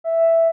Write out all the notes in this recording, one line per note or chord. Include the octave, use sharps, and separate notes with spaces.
E5